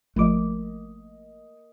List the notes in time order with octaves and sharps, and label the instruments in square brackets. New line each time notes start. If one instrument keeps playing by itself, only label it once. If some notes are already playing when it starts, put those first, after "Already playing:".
[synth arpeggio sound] G#1 F3 D6 [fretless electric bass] A3 [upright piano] A#3 D#5